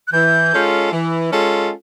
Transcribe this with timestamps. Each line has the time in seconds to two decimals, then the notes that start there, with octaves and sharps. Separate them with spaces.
0.07 F#6
0.12 E3 G6
0.53 G#3 C#4 F4 A4
0.92 E3
1.31 G#3 C#4 F4 A4